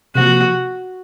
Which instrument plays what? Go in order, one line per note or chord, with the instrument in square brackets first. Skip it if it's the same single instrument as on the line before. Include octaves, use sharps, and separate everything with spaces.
[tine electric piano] C3 F3 A#3 [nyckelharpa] F#4